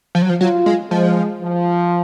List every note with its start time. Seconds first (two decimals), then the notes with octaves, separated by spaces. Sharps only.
0.15 F3
0.22 F#3
0.29 F3
0.40 F#3 F4
0.66 G#3
0.91 F3 G#3
1.42 F3